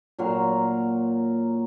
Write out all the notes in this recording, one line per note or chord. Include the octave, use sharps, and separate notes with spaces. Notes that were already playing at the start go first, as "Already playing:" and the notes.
A#2 F#3 A#4 C6